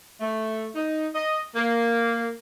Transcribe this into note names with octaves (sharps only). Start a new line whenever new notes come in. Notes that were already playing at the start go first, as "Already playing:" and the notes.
A3
D#4
D#5
A#3